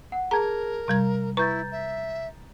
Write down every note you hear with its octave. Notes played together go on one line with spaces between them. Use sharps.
F#5
G#4 A#4 A5 A#5 G#6
C3 G3 A#5 G#6
E4 B4 A#5 C#6 G6 A6
E5